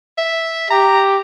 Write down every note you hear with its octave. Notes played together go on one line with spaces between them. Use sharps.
E5
G4 A#5